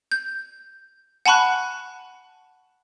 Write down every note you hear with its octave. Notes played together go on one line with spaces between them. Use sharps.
G6
F#5 G#5 A5 B5 C#6 F#6